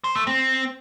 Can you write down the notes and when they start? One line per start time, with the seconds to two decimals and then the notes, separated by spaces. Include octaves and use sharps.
0.04 C5
0.16 A3
0.27 C4